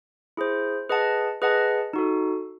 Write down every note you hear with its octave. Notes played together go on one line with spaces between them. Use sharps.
E4 G#4 C5
G#4 B4 D#5 F#5 A5
G#4 B4 D#5 F#5 A5
D#4 F#4 A4